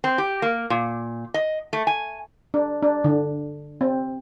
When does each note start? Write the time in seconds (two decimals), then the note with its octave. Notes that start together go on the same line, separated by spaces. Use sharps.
0.04 C4
0.18 G4
0.42 A#3
0.70 A#2
1.34 D#5
1.73 A3
1.87 G#5
2.54 D4
2.83 D4
3.04 D3
3.81 C4